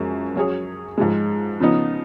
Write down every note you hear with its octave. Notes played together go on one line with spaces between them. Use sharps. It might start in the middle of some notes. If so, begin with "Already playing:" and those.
Already playing: F#2 F3 G#3
F#3 C#4 G#4 C#5
G#2 F3 G#3
C#3 F3 B3 D#4